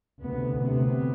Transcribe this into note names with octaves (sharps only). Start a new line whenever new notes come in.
D2 C3 B3
D2 C3 B3